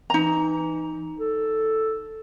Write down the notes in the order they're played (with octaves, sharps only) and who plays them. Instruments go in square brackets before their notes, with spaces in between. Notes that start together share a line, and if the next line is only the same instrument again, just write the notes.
[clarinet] E3 [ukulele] D#4 A#5
[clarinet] A4